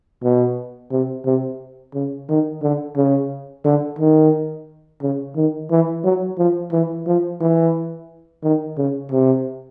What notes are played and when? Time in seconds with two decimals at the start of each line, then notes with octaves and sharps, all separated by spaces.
0.23 B2
0.91 C3
1.26 C3
1.94 C#3
2.29 D#3
2.62 D3
2.96 C#3
3.65 D3
3.99 D#3
5.02 C#3
5.36 D#3
5.70 E3
6.04 F#3
6.38 F3
6.72 E3
7.07 F3
7.40 E3
8.43 D#3
8.77 C#3
9.11 C3